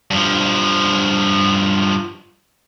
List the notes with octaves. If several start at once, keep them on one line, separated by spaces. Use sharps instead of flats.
G2 F3